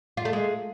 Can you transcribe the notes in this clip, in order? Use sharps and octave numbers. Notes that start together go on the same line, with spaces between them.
F4
A3
G#3